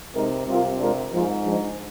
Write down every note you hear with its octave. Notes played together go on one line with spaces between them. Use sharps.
C3 G#3 D#4 A#4
C3 G3 C4 F4 A#4
G#3 D4 F4 A#4
G#2 F3 A#3 F4 G#4
F3 G#3 D4